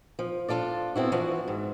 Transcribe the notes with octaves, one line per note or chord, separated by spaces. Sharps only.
F3
D4 F4 A4 D5
B3 C4 E4 F#4
E3 F3 D4 F#4
G#2